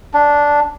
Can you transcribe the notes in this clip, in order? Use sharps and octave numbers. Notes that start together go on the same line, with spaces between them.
D4